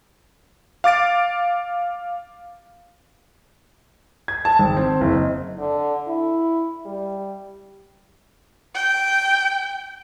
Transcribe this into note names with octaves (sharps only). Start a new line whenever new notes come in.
F5 D6 A6 D7
G#6
A5
G#1
C4
F#1
D#5
D3
E4
G3
G5